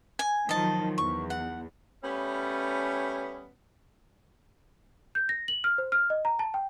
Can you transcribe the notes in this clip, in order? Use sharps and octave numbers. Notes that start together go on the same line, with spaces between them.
G#5
D#3 F3 F#3 D#5 A5
E2 C#6
F#5
G3 A3 B3 C#4
G6
A#6
F#7
F6
C5
F6
D#5
A#5
A5
G5